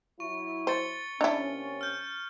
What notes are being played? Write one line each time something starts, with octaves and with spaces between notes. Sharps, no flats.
F#3 E4 C#6
C5 A6 C#7 G7
C3 A#3 C#4 D4 E4
F6 G6